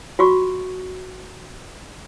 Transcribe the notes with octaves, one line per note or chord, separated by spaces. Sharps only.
F4 F#4 C#6